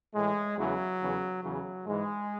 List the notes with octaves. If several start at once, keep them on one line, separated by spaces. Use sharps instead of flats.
A2 E3 G#3
E2 C#3 E3 F#3
E2 C#3 E3
E2 C#3 E3 F#3
G#2 E3 G#3